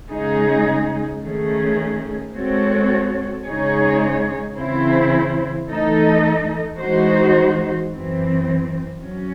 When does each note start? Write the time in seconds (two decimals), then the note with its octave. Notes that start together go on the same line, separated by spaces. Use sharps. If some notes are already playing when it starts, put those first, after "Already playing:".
0.11 C#3 G#3 D#4 G#4
1.22 D#3 A3 C#4 G#4
2.34 G#3 C4 F#4 A4 C#5
3.45 C#3 G#3 D#4 G#4 C#5
4.56 C#3 E3 C4 E4 C5
5.68 E3 A3 D#4 A4 D#5
6.78 E3 G#3 D#4 F#4 C5
7.91 F#2 E3 C4
9.02 F#3 C#4